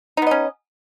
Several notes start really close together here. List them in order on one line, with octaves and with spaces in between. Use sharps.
D#4 B3 D#5 C#4